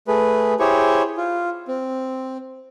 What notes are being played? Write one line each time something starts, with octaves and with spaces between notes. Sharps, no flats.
A3 G#4 B4
E4 G4 G#4 C5 C#5 C#6
F4
C4